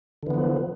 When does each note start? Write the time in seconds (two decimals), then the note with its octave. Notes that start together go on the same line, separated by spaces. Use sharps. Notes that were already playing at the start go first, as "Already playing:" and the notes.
0.23 D3
0.27 E3
0.30 B3
0.34 F3